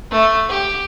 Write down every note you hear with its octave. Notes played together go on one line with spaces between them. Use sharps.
A3
G4